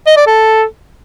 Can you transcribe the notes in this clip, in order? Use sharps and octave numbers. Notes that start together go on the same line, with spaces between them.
D#5
D5
A4